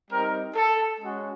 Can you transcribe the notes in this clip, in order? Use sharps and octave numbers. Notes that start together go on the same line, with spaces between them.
G3 C4 D#4 A#4
A4
G#3 C#4 F#4